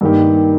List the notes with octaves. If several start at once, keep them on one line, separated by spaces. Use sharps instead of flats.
G2 D#3 A#3 D#4 G4